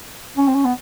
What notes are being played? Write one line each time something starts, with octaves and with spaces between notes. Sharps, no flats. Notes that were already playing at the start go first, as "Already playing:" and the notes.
C#4
C4
C#4
B3